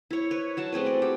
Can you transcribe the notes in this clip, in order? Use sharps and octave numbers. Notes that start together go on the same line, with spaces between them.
E4 C#5
B4 C#5
F#3 F#4 A5
A3 C4 G#4 B4
D5
G4